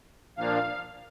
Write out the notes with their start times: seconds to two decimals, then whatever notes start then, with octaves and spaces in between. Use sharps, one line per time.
0.38 A#2 F3 A#3 D4 F5